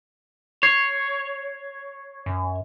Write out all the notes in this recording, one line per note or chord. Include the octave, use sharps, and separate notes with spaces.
C#5 G#6 C7
F#2